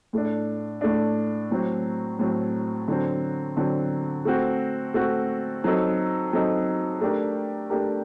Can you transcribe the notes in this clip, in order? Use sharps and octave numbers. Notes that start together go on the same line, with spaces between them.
A2 A3 D4
A2 A3 D4
A2 F#3 C4
A2 F#3 C4
D3 F#3 C4
D3 F#3 C4
A3 C4 F#4
A3 C4 F#4
F#3 C4 D#4 A4
F#3 C4 D#4 A4
A3 D4 G4 A#4
A3 D4 G4 A#4